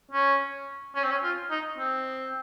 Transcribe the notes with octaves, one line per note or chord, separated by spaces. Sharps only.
C#4
C#4
C4
C#4
F4
D#4
C4